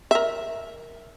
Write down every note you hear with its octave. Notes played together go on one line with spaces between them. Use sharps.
A#4 E5